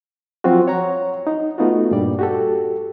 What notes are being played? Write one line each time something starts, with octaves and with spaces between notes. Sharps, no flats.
F3 F#3 C4 F4 F#4
C#5 F#5 A#5
D#4
A3 B3 D#4 F4 F#4
G2 A#2 G3 D5
F#4 G4 A4